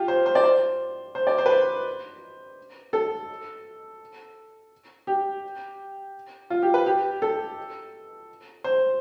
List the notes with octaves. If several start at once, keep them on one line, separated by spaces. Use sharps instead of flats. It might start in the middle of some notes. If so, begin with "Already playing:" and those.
Already playing: F4 G4
C5
C5
D5
C5
C5
D5
C5
B4
C5
A4
G4
F4
G4
B4
G4
A4
C5